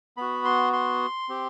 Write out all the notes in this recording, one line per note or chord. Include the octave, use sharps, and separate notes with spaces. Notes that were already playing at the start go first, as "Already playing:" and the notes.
B3 F#4 B5
C6
C6
C4 G4